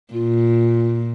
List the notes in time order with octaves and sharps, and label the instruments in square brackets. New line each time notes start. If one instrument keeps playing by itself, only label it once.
[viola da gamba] A#2 [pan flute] F4